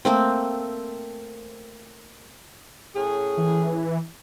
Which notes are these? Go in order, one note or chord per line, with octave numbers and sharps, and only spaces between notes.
A3 A#3 C4
A2 C#4 G#4
E3